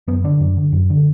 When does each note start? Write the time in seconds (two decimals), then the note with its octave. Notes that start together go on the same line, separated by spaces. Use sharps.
0.07 F#2 B3
0.24 D3 D4
0.40 F#2
0.57 D3
0.73 F#2
0.90 D3